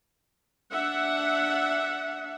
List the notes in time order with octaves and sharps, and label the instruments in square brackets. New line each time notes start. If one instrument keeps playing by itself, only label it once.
[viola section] D4 E5 F#5